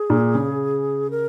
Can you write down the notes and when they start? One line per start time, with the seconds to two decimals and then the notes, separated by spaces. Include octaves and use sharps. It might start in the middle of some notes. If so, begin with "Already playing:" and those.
Already playing: G#4
0.10 A#2
0.35 C#3
1.11 A#4